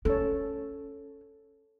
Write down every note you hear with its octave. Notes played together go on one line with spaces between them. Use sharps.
C#4 A4 C#5